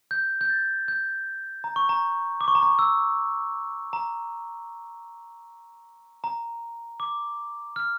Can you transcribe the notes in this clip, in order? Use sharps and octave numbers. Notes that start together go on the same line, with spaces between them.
G6
G6
A6
G6
A#5
C#6
A#5
D6
C#6
A#5
C#6
E6
A#5
A#5
D6
F6